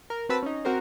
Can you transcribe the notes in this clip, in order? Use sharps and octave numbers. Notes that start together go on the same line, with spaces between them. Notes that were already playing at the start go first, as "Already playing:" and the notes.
A#4
C4 F#4 B4 A5 B5 E6
C#4 D#4
C4 F#4 A#4 C5